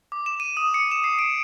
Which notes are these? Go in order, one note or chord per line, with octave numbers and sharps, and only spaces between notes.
D6
E7
D#7
D#6
C#7
E7
C7
D7